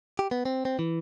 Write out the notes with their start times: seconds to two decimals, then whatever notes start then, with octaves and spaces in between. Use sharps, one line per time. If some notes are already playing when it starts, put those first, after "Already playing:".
0.19 G4
0.31 B3
0.45 C4
0.65 C4
0.79 E3